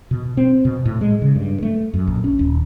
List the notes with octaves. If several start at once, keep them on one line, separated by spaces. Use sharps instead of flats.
B2
C4
B2
A2
G#3
C#3
G2
A3
F#2
A#1
C#4
D#1